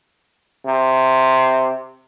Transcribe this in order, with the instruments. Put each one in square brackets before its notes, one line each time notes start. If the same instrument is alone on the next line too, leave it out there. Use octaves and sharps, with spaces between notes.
[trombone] C3